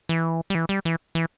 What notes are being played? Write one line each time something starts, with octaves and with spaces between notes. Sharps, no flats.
E3
G3
E3
G3
E3
E3